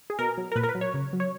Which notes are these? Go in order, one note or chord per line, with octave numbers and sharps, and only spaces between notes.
G#4
B2 A#4
F#3
A#4
A#2 B4
A#4
B4
F#3
C#5
C#3
F#3
C#5